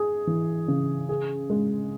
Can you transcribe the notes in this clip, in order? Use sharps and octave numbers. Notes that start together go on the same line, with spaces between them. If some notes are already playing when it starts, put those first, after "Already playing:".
Already playing: G#4
E3
C#3
G#4
G#3